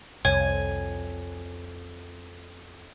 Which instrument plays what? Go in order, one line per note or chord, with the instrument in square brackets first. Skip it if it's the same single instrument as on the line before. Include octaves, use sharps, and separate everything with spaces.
[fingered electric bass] C2 [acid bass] F2 [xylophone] C#5 [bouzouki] G#5